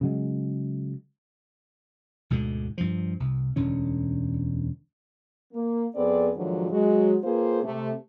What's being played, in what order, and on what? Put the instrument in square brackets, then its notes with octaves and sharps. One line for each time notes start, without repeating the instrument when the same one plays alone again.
[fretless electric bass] C#3 F#3 G#3
[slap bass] D2 G#2 B2 D3
G2 F3
C2
E1 D2 D3 C#4
[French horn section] A#3
F2 B3 C4 G#4 A4 D5
G#2 D3 D#3 F3 F#3
F#3 G#3 F#4
A#3 C4 F4 G#4 B4 C5
C3 A3